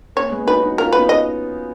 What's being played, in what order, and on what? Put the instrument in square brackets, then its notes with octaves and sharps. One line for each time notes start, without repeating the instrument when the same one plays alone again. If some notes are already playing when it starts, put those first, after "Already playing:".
[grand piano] A#3 C#4 [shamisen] C#5
[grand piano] C#4
G#3 B3
[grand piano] D#4 F#4 [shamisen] B4
[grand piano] D#4 F#4
[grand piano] C#4 F4 [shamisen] A#4
[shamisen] B4
[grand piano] B3 D#4
[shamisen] D#5